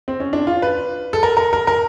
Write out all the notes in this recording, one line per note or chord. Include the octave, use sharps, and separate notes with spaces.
C4
C#4
D4
F4
B4
A4
A#4
A#4
A#4
A#4